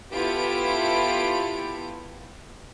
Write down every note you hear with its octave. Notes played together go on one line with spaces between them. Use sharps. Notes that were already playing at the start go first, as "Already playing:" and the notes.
B3 E4 F4 G4 A4 D7